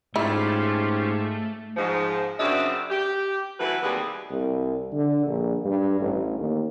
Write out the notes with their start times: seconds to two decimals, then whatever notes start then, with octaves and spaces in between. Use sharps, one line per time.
0.16 G#2 A3 C#4 E4 F4 G4
1.77 G#2 F3
2.39 F#2 C#3 C4 D4 E5
2.90 G4
3.60 E3 F#3 A3 B4
3.83 D#2 C3 G3 G#4 B4
4.31 C2
4.93 D3
5.26 A#1
5.65 G2
6.01 A1
6.39 D#2